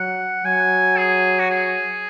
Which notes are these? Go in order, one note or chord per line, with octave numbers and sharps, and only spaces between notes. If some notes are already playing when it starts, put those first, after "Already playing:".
Already playing: F#3 F#5
F#3 G#5
G#4
F#4
G#4